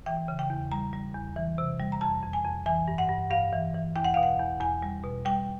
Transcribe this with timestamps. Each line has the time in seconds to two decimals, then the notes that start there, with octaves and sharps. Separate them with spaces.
0.06 E3 G5
0.28 C#3
0.39 G5
0.50 E2
0.72 G3 A#5
0.93 G3
1.15 E2
1.36 E3
1.58 C3
1.79 G3
1.92 A#5
2.01 F2 A5
2.22 F2
2.33 G#5
2.45 F2
2.66 E3 G#5
2.88 G2
2.98 F#5
3.09 G2
3.31 G2 F5
3.53 E3
3.74 E3
3.96 E2 G5
4.04 F#5
4.14 B2 F5
4.23 F#5
4.39 E2
4.60 E2 G#5
4.82 G3
5.04 B2
5.25 G3 G5